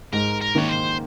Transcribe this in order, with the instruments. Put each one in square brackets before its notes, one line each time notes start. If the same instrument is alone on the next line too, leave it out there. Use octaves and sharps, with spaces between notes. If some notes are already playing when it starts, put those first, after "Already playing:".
[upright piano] G#2 [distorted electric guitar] A#4
[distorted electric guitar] A#4
[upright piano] D#3 A#3 [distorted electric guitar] C#5
[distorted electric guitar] C5